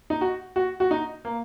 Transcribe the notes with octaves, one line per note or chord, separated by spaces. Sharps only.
D#4
F#4
F#4
F#4
D#4
A#3